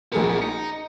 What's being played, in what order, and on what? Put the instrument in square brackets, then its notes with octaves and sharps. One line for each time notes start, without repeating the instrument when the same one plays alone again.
[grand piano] A#1 G#4 A#4 [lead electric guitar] F#2 B2
[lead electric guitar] D#4 [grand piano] C#7